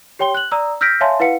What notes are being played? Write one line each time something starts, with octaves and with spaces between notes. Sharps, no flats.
G4 C#5 G5 C6 G7
F#6 F#7
D5 A#5 D#6 E6
E6 F6 G6 A#6 B6 D7
C#5 E5 F5 G#5 A5 C6
E4 B4 F5 F#5 C#7